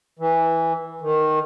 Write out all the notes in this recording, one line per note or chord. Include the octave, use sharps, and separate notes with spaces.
E3
D#3